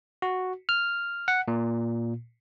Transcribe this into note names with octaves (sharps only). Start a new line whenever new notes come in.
F#4
F6
F#5
A#2